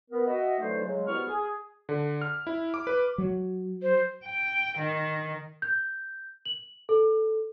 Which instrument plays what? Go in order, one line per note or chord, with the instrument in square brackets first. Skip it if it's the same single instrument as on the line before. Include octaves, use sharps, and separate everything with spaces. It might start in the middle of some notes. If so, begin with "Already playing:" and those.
[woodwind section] B3 A#4
F#4 D#5 E5 F#5
D3 E3 F#3 A3 D#4 C5
C#3 F#3 G#3
C2 B2 B3 E4 C#6 F6
G#4
[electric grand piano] D3
F6
E4
D6
B4
[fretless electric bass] F#3
[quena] C5
[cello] G5
D#3
[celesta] G6
F#7
A4